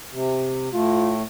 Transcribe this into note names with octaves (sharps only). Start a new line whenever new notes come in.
C3
A2 A3 F4